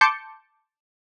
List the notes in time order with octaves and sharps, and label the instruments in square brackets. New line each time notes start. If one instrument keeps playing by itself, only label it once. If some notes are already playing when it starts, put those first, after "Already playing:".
[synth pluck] A5 C6 D6 G6 C#7